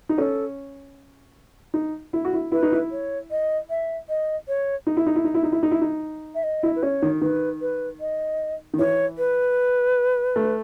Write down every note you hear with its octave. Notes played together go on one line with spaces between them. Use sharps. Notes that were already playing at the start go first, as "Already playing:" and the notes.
D#4
C#4 A4
D#4
E4
F#4
E4
E4 B4
D#4
E4
C#5
D#5
E5
D#5
C#5
D#4
E4
D#4
E4
D#4
E4
D#4
E4
D#4
E4
D#4
E5
D#5
E4
B4
C#4 C#5
D#3
D#3 B4
B4
D#5
D#3
E3 C#5
B4
A3